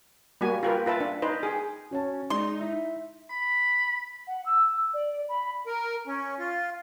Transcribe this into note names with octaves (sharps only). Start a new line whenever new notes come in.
G3 A#3 F#4 G#5
F4 G4 A#4 B4
F4 B4 E5 A5
D4
D#4 B4 C5
G#4 G5
C#4 F#4 C#5 A5
G#3 D#4 D5 C6
E4 E5
B5
F#5
E6
D5
B5
A#4
C#4
F4